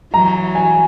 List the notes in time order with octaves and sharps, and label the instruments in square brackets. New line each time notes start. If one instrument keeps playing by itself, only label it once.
[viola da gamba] E3 F#3 [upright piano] A#5
[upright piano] G#5